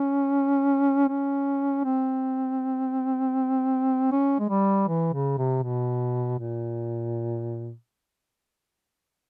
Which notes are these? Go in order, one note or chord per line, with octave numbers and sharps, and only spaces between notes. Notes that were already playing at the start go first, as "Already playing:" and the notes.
Already playing: C#4
C#4
C4
C#4
G#3
G3
E3
C#3
C3
B2
A#2